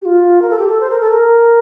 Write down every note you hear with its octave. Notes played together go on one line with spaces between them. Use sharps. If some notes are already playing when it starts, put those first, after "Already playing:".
G4
F4
A#4
A4
G4
A4
C5
A#4
A4
A#4